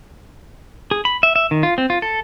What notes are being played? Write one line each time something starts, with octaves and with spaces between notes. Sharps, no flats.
G#4
B5
E5
E5
D#3
F4
C4
F4
A4